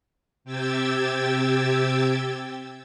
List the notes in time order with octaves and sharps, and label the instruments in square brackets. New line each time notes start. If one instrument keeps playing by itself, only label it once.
[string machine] C3 G4 G5 E6 G#6 A6